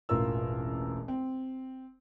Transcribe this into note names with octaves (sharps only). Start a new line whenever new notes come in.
E1 A1 F4 A#4 E6
C4